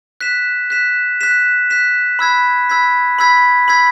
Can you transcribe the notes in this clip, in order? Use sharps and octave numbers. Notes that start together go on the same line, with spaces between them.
F#6 B6 E7
F#6 B6 E7
F#6 B6 E7
F#6 B6 E7
B5 E6 G#6 B6
B5 E6 G#6 B6
B5 E6 G#6 B6
B5 E6 G#6 B6